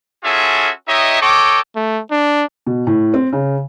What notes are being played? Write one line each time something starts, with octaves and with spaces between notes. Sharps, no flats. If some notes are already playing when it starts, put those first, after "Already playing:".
C#4 F4 F#4 G#4 A4 E5
D#4 G4 C#5 D#5 E5
A4 C#5 D#5 G5 D6
A3
D4
B2
A2
C4
C#3